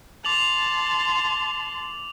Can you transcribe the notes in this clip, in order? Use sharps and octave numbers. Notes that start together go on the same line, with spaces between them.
A5 C6 D6 F7 F#7